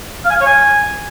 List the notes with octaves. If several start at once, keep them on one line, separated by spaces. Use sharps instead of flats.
F5
G#5
F5
C#5
G#5